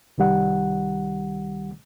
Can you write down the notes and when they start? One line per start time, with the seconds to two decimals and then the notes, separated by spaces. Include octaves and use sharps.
0.18 C2 D#3 G3 F#5